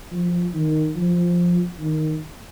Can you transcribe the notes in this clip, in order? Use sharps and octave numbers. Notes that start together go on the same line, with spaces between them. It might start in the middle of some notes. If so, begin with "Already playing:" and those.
F3
D#3
F3
D#3